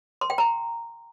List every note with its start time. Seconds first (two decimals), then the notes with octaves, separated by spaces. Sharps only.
0.21 C6
0.30 G5
0.38 A#5